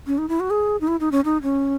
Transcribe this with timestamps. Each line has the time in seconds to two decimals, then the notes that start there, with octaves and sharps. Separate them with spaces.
0.07 C#4
0.18 D#4
0.29 E4
0.40 F#4
0.50 G#4
0.81 D#4
0.87 E4
1.00 D#4
1.12 C#4
1.25 D#4
1.43 C#4